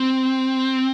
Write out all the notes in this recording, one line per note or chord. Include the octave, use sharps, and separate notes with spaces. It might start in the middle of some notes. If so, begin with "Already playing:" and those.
Already playing: C4